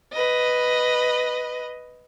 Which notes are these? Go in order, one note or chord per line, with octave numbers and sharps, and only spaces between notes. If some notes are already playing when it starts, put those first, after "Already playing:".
B4 D#5